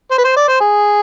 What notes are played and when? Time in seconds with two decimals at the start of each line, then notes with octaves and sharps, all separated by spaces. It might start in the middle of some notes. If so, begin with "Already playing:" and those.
0.11 C5
0.18 B4
0.24 C5
0.36 D5
0.48 C5
0.60 G#4